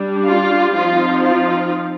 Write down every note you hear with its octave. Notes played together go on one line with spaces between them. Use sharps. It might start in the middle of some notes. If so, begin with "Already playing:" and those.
Already playing: G3 D4
F4
F3 C4 D#4 F4
F4